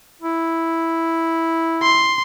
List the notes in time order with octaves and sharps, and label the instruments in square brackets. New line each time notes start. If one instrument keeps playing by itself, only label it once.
[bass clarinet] E4
[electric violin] C6